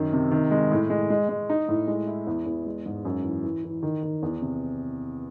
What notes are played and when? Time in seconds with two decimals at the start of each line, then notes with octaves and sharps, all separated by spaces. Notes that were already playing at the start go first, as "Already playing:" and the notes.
Already playing: F#2 D#3
0.13 C3
0.31 D#3
0.51 G#3
0.71 A2
0.90 G#3
1.10 G#3
1.29 G#3
1.50 D#4
1.68 A2
1.87 G#3
2.07 E4
2.27 E2
2.46 E2
2.66 G#3
2.86 G#2
3.05 F#2
3.24 E3
3.44 E3
3.64 E3
3.83 D#3
4.03 D#3
4.22 E2
4.42 C3